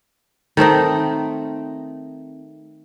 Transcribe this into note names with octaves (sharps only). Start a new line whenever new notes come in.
D#3 A3 C4 D#4